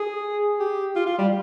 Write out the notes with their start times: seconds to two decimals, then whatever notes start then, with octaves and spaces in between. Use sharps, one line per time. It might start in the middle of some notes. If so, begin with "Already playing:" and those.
Already playing: G#4
0.60 G4
0.96 F4
1.06 F4
1.18 G3